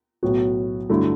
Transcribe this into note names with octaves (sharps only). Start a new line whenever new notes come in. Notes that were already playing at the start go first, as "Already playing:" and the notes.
B1 A2 F#3 B3 F#4
G2 D3 F#3 A3 E4